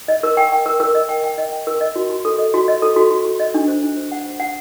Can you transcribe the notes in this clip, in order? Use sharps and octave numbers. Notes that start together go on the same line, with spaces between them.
D#5
A#4
G5
G5
A#4
A#4
D#5
G5
G5
D#5
G5
A#4
D#5
F#4
F#4
A4
D#5
F#4
D#5
A4
F#4
F#4
F#4
D#5
D4
C5
D4
C5
F#5
C5
F#5